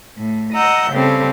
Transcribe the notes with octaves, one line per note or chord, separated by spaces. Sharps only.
A2
D#5 F#5 A#5 E6 G6
C#3 G3 C4 A4